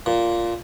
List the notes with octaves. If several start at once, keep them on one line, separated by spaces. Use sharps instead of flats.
A#2